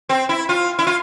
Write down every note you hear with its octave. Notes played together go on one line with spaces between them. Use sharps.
C4
E4
F4
E4
F4